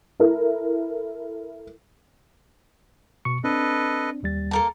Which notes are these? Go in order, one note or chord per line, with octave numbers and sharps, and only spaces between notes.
E4 A4 A#4
B2 C#6 C#7
C4 D4 A4 B4 D#5
D#2 G3 A6
A#3 A4 A#4 A5